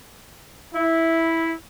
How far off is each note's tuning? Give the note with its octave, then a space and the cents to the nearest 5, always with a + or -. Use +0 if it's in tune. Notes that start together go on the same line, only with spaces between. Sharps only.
E4 -5